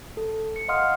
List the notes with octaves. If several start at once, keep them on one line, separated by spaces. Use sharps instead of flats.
A4
C#7
D#5 F5 F#5 C6 D#6 F6